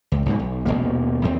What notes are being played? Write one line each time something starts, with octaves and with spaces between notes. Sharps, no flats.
C#2
B1 G#2 B2
B1
D#1 C#2 B2 A#3
D#2 C4